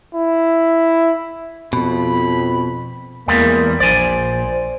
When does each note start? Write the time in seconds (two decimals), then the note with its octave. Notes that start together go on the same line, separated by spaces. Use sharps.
0.14 E4
1.73 F2 B2 B5
3.28 E2 G3 G#3 A#3
3.80 A#1 C5 D5 G#5